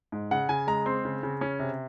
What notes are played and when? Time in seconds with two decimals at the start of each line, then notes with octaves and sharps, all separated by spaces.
0.12 G#2
0.31 C#3 F#5
0.49 C#3 G#5
0.67 G#3 A#5
0.86 C4 C6
1.05 C#3
1.23 C#3
1.41 C#4
1.59 C3